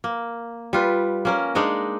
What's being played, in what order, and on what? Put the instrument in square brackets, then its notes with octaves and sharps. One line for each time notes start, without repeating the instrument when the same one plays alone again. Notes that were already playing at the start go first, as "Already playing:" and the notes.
[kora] A#3
G3 F4 B4
A#3 C#4 A#4
G#3 D4 D#4 D#5